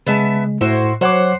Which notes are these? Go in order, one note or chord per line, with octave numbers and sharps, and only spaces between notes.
C#3 G#3 B3 E5 A5
A2 E4 F#4 C5
F#3 C5 C#5 F#5 D6